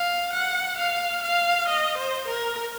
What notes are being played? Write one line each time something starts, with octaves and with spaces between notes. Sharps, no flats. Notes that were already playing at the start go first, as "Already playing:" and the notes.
Already playing: F5
F#5
F5
F5
D#5
C5
A#4